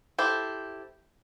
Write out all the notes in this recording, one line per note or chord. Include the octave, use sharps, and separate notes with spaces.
E4 G4 A4 C5